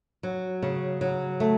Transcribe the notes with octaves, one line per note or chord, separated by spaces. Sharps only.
F#3
C#3
F#3
A3